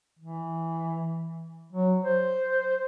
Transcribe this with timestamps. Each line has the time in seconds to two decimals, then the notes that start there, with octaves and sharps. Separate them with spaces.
0.19 E3
1.72 F#3
2.03 C5